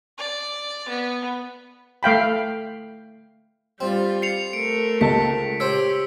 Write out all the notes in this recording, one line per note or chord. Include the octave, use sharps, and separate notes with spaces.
D5
B3
A3 F5 G5 B5
G3 C4 F4
C7 C#7 F7
A3 A#4 D7
C#2 D#5 A5 B6
G4 C5 C#5 E6